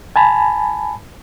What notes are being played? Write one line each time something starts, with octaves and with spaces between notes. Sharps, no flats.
G#5 A5 B5